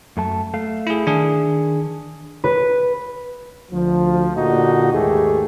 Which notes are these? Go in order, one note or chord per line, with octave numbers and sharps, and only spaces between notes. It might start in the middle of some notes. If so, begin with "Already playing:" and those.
F#2 A3 A5
A3 F5
E4 G#4
D#3 D4 G#4
B4
D2 F3
A#2 D3 D#4 F#4 G4
D#2 G#2 A3 G4 G#4